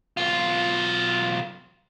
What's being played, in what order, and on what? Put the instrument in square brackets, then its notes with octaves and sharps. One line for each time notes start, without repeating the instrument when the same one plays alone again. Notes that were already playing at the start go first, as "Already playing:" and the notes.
[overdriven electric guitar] B1 F4